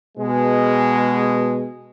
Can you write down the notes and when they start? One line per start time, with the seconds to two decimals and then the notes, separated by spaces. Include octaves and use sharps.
0.18 B2 G#3